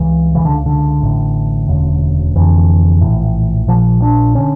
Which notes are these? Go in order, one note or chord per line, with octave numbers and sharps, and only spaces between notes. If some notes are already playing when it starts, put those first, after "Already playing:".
Already playing: C#2 C#3 E3
C#2 C#3 E3
D3
D3
A1 A2
E1 D2 C#3
F1 F2 D3 E3
A#1 A2
A#1 A#2 F3
D4
D3 C#4